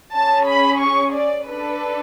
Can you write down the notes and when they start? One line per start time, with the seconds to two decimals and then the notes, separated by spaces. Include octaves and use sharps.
0.15 C#4 G#4 A5
0.47 B5
0.80 C#6
1.13 D5
1.45 D4 A4 B4